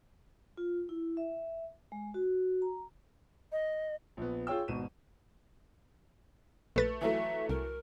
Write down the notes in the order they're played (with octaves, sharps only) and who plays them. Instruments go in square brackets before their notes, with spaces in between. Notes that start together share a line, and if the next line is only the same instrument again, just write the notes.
[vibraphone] F4
E4
E5
G#3
F#4
A#5
[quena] D#5
[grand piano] A#1 B3
F4 G#4 C#5 G5 E6
G#1 B2 D#7 E7
[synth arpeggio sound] A#1 B4 A6 [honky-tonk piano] A3
[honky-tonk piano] E3 F#3 A3 [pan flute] E5
[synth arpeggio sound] C2 [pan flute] A#4